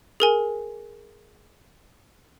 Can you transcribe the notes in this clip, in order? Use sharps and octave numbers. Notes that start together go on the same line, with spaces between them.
G#4 A#4 G#5